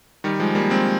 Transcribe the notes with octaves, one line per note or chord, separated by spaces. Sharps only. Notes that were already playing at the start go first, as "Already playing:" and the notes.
D#3 G3
F3 G#3
G3 A#3
G#3 C4